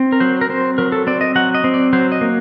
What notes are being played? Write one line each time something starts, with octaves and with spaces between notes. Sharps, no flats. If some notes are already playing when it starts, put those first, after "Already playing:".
Already playing: C4
A#4
F#3 C5
A#4
C4 C5
F#3 A#4
A4
C4 D5
D#5
F#3 F#5
D#5
C4
D5
F#3 C5
D#5
A#3